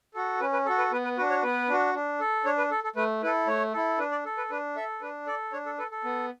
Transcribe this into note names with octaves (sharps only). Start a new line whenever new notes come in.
F#4 A4
C#4 B4
B4
F#4 A4
B4
B3 B4
B4
D4 F#4 B4
C#5
B3 B4
D4 F#4
D4
A4
D4 C#5
B4
A4
A4
A3 B4
E4 A4 B4
A3 C#5
E4 A4
D4 B4
D5
A4
B4
D4 B4
A4 E5
D4 B4
A4 D5
D4 C#5
A4
A4 B4
A4
B3